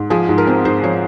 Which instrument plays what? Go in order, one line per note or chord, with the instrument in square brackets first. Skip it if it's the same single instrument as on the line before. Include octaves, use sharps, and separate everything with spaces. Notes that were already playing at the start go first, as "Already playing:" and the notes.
Already playing: [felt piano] G#2
F3 G#4
G#2
A#4
C4
G#2 C5
F3 C#5